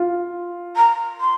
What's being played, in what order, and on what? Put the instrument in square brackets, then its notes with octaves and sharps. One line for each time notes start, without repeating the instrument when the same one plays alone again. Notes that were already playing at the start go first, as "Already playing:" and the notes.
Already playing: [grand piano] F4
[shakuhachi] A#5
C6